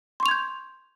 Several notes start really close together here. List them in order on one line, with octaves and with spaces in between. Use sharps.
C6 C#6 F7 G#6 G6